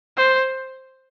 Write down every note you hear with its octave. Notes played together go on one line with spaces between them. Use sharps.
C5